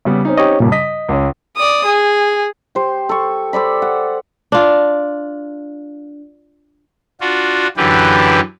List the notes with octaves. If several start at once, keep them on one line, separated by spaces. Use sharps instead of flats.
C#3 G3 B3
C4 C#4 D#4
G4 C#5 D#5
G2 A#2 C#3 G3
D#5 B6
C#2 C#4
D5 D#6
G#4
G4 C5
A4 C#6
A4 C5 D5 B5
F#5
D4 F4
D4 F4 F#4
F#2 D3 E3 G4 B4